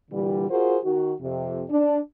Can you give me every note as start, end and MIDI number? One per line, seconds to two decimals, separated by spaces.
0.11 0.46 46
0.11 0.46 50
0.11 0.46 52
0.11 0.46 55
0.50 0.77 65
0.50 0.77 66
0.50 0.77 68
0.50 0.77 70
0.50 0.77 72
0.83 1.13 51
0.83 1.13 66
1.21 1.62 41
1.21 1.62 48
1.69 1.98 62